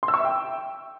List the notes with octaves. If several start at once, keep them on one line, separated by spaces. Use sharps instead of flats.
C6
E6
C#6
E5
G5